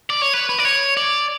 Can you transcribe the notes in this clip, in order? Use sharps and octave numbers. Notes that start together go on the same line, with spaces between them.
D5
C#5
B4
B4
D5
C#5
D5